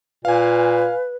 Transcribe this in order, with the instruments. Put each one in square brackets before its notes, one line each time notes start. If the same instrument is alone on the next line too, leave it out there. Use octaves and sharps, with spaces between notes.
[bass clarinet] A#2 [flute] B4 [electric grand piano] F5 G#5